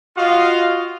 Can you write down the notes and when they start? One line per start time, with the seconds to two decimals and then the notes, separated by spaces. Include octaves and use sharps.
0.16 F4 F#4 D#5 F5